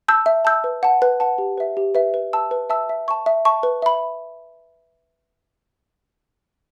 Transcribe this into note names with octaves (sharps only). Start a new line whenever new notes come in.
A5 E6 G6
E5
A5 E6 G6
B4
F#5 A5
B4
F#5 A5
G4
B4 E5
G4
B4 E5
B4
E5 A5 E6
B4
E5 A5 E6
E5
A5 C#6
E5
A5 C#6
B4
E5 B5